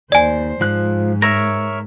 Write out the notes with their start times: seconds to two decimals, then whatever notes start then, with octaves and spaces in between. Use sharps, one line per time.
0.12 D#2 C5 D5 G#5
0.61 G#2 F3 F#6
1.22 A#4 C#5 E5 A#6